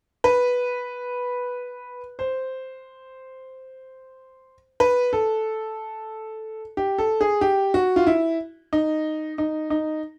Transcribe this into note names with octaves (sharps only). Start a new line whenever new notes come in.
B4
C5
B4
A4
G4
A4
G#4
G4
F#4
F4
E4
D#4
D#4
D#4